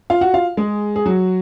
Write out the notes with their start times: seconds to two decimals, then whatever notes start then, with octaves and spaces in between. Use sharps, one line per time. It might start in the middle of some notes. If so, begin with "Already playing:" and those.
0.10 F4 F5
0.21 F#4 F#5
0.34 F4 F5
0.57 G#3 G#4
0.96 G#4
1.06 F#3 F#4